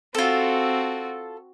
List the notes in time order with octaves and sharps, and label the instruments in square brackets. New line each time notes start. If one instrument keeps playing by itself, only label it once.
[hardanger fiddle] C4 F#4 [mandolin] F4 A4